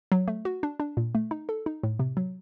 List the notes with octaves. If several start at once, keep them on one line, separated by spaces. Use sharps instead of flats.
F#3
A3
F#4
D4
D4
A#2
A3
D#4
A4
D#4
A2
C3
F#3